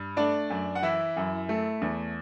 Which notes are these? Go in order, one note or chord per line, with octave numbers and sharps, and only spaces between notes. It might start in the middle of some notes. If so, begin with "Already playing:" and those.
Already playing: G2
A3 D4 D5
F#2
F#5
E3 E4 E5
F#2
A3
E2